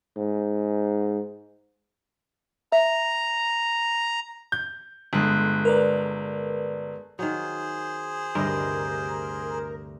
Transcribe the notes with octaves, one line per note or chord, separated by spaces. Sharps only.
G#2
E5 A#5
G6
G1 G#3 A4 F#6
A#4 B4 D5
D#3 F#3 G#4 C5
D2 G2 C3 G4 A#4 D#5 C6